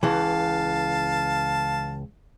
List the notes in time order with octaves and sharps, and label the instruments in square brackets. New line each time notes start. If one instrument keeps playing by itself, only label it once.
[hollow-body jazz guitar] C#2 E3 [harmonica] F5 A5